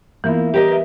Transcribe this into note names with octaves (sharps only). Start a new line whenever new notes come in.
E3 A#3 B3 E4 F4
G3 G4 A#4 D#5
B4 E5